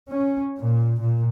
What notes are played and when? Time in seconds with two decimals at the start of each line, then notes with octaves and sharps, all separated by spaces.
0.11 C#4
0.58 A#2
1.00 A#2